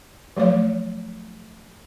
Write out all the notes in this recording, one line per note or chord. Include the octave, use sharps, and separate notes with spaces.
F3 F#3 A3 C#5 F5